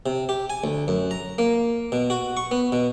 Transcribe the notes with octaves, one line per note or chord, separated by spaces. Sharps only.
C3
G4
G#5
D2
F#2
A#5
A#3
B2
F#4
C#6
B3
B2